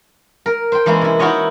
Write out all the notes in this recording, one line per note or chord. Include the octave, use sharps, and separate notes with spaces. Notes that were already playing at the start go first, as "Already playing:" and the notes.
A#4
C5 G5
E3 G#3 A#3 C#4 E4
C3 E4
D#4 E4 F#4 A#4 C#5 D#5